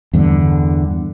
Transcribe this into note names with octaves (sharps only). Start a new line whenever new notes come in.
E2 G2 D3